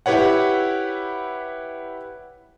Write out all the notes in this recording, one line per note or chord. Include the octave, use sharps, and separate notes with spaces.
E4 G4 B4 C#5 F#5